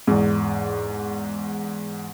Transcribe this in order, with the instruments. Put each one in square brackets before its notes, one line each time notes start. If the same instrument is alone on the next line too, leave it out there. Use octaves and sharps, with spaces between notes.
[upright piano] E2 G#2